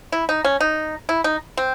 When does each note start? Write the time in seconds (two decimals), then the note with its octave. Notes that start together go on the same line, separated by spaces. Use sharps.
0.12 E4
0.29 D#4
0.45 C#4
0.61 D#4
1.09 E4
1.24 D#4
1.57 C4